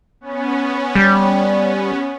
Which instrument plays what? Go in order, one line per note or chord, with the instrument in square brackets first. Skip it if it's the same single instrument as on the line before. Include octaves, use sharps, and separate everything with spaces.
[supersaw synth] B3 C#4
[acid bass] G3